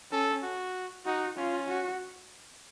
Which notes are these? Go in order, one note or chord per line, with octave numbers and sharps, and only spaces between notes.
C#4 A4
F#4
D#4 F#4
C#4 F4
F#4